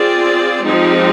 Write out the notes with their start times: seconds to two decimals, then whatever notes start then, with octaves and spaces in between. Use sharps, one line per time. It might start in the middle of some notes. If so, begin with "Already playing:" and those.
Already playing: C4 F4 G#4 D5
0.64 F3 G#3 C4 D#4 G4